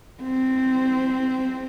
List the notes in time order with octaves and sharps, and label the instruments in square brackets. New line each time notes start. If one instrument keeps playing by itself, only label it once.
[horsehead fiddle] C4